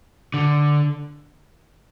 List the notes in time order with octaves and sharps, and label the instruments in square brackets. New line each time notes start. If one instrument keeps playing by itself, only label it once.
[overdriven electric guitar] D3